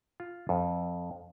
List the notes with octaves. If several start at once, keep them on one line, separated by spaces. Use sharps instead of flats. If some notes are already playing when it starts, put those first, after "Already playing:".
F4
F2